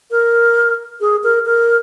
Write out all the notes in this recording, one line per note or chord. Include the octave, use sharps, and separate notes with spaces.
A#4
G#4
A#4
A#4